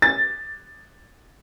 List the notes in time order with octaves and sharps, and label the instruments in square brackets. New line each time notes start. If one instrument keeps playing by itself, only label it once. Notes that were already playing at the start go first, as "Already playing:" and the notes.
[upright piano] A6